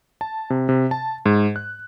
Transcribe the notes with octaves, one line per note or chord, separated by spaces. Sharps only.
A5
C3
C3
A5
G#2
F#6